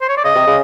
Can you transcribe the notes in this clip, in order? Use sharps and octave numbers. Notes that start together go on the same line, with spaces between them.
C5
C#5
D5
C#3 D#5
C3
C#3